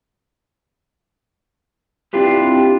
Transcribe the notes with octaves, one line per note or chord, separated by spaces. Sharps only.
C4 D4 E4 F4 G4 B4